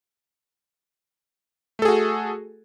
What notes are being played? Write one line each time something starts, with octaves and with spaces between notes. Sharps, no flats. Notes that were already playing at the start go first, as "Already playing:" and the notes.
A3 F#4 G#4 A4